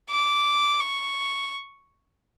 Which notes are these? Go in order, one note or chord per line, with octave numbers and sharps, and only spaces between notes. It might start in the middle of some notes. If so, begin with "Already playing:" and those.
D6
C#6